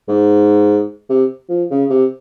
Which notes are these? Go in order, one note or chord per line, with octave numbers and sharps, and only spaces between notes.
G#2
C3
F3
C#3
C3